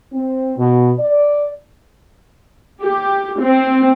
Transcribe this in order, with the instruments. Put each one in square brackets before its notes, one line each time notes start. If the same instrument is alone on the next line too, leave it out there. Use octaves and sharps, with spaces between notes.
[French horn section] C4
B2
D5
[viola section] G4
C4